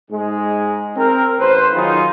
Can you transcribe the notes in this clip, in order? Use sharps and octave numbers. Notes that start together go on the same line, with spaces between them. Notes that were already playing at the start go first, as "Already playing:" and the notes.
G#2 G#3
C4 A#4
A1 B4 C5
D#3 F#3 D#4 F4 G#4